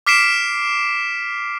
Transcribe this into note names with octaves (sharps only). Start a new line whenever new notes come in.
D6 F6 B6 C7 D7 E7